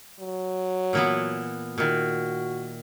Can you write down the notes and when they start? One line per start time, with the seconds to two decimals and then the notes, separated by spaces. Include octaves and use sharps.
0.20 F#3
0.93 A#2 E3 B3
1.78 A#2 D#3 F#4